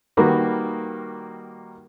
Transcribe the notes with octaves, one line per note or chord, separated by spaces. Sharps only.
D#3 G3 A#3 F#4 B4